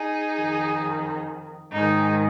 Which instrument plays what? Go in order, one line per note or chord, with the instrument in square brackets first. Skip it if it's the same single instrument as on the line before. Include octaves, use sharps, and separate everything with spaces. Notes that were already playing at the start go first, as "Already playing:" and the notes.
Already playing: [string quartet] D#4 G#4
F2 D#3
G#2 D#3 D#4 G#4